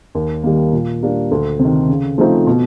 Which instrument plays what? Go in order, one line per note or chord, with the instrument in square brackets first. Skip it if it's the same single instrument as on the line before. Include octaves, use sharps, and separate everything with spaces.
[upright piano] D#2
D#3 G3 A#3
A#2
G3 A#3 D4
D2
C3
D#3
C#3
F3 A3 C4 D#4
B2